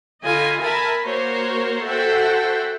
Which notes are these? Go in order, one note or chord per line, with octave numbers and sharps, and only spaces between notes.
D3 F4 D#5 G#5 B5
A#4 E5 G#5 A5 B5
A#3 F#4 A#4 C5 C#5
F#4 A4 C5 E5 F#5 G5